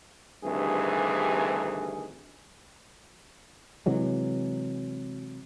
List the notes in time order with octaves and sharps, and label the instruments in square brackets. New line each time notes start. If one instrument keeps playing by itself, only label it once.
[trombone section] D2 G2 C3 D#3 E3 G#4
[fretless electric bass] C3 E3 F#3 G#3